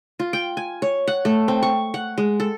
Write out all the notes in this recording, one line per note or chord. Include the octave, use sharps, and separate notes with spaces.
F4
G5
G#5
C#5
F#5
A3
C4
C#6
F#5
G#3
A4